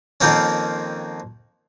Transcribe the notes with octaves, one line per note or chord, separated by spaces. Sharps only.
F2 D#3 F3 A#3 C4 C#4